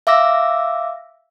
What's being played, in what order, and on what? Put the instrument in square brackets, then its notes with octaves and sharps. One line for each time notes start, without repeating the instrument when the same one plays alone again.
[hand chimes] E5 F5 D6 E6 A#6